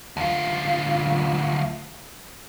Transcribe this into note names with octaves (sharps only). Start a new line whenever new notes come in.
D2 F4